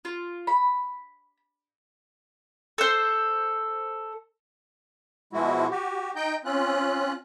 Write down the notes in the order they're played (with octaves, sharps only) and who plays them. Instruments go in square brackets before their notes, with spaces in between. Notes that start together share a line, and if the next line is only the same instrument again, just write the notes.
[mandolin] F4
B5
A4 C5
[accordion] B2 F3 G#3 E4 F#4
F#4 G4
D#4 D#5 G5 G6
C4 C#4 F4 F#6